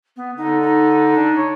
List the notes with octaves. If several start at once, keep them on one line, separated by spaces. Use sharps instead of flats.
B3
D3 D#4
D#4
D4
C#5